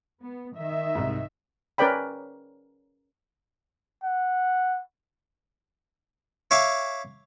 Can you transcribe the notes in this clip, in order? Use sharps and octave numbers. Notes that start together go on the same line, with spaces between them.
B3
D#3 D#5 E5
C2 G#2
C#4 A#4 B4 D5 G5 B5
F#5
C#5 E5 F5 C#6 D6